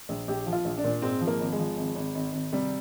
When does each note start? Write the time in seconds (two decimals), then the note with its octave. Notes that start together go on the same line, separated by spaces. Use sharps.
0.09 A#1
0.28 A#1 G4
0.46 F3
0.53 F4
0.65 A#1
0.78 D4
0.84 A#2
1.02 G#2 C4
1.21 F3
1.27 A#3
1.40 G#1
1.52 G#3
1.59 F3
1.77 G#1
1.96 G#1
2.15 G#1
2.33 G#1
2.53 C3 G3